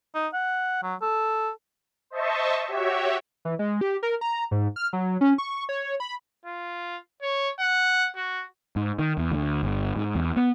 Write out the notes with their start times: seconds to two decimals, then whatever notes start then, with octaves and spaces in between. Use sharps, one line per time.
0.15 D#4
0.34 F#5
0.83 F#3
1.02 A4
2.10 C5 D#5 E5 A5 C#6
2.68 F#4 G4 C#5 E5
3.45 E3
3.59 G#3
3.81 G4
4.03 A#4
4.21 A#5
4.51 G#2
4.76 F6
4.93 F#3
5.21 C#4
5.38 C#6
5.69 C#5
6.00 B5
6.45 F4
7.22 C#5
7.59 F#5
8.16 F#4
8.76 G#2
8.99 D#3
9.18 E2
9.32 D2
9.63 G1
9.96 G#2
10.15 E2
10.36 B3